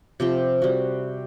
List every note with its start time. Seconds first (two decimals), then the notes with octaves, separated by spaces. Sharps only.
0.20 C3 F3 G4
0.62 G3 F#4